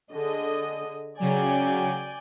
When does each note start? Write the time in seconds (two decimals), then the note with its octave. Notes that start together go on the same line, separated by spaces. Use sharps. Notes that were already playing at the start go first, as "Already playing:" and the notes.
0.13 D3 G#4 D#5
1.20 C#3 F#3 D5 G5 G#5